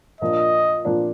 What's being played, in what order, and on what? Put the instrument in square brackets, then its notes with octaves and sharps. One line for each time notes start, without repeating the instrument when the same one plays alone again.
[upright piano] A#2 F3 A#3 D4 [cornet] D#5
[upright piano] A#2 F3 A#3 D4